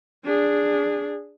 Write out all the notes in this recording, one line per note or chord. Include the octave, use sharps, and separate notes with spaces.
D4 G#4